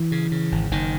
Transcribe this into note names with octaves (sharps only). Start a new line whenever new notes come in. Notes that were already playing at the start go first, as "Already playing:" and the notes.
Already playing: E3
C#3
C#3
G#1
F#1 D#3